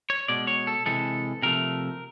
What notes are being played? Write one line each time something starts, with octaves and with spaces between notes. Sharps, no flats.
C#5
B2 G#3 D5
C#5
A4
C3 E3 G#3 A4
C3 F3 A3 A#4